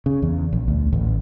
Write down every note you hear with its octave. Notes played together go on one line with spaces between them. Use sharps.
C#3
E2
A#1
D2
A1